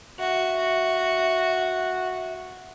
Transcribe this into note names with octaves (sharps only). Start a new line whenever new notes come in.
F#4 E5